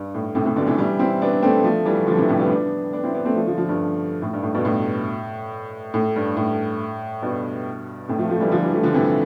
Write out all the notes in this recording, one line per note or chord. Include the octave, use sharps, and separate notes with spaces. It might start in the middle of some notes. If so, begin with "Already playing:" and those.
Already playing: G2
A2
A2 C3
A2 C3
B2 D3
C3 E3
E3 G3
C4 E4
B3 D4
A3 C4
F3 A3
E3 G3
D3 F3
C3 E3
A2 C3
G3 B3
B3 D4
B3 D4
C4 E4
B3 D4
A3 C4
F3 A3
D3 F3
D3 F3
G2
A2
G2
A2
G2 B2
A2
A2
G2
A2
G2 B2
A2 C3
F3 A3
F3 A3
E3 G3
D3 F3
E3 G3
F3 A3
D3 F3
C3 E3